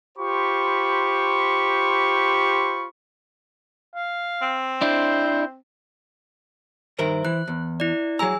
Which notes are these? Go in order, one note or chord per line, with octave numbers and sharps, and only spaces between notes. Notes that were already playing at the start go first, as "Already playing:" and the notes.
F4 G4 C5 B5 C#6
F5
C4
D4 E4 C5
G2 D#3 A#4 C5 E5
E3 F#6
E2
E4 D5
F#3 G#4 G#5 A#5 E6